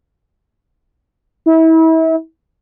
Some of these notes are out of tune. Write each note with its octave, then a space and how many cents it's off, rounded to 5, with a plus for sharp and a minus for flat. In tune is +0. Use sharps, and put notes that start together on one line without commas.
E4 -35